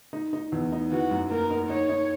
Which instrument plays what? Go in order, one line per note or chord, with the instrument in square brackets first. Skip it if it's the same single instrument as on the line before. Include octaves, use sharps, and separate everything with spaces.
[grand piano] D#4
D#4
E2
D#4
[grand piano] E3 [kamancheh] F#4
[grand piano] F#2
[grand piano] A#3 [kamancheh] A#4
[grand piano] D#4
[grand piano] D#4 [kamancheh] C#5
[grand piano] D#4